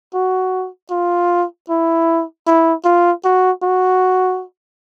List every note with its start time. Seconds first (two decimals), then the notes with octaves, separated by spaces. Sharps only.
0.14 F#4
0.91 F4
1.69 E4
2.47 E4
2.85 F4
3.24 F#4
3.62 F#4